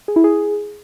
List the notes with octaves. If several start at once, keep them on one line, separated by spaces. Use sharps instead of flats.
G#4
E4
G#4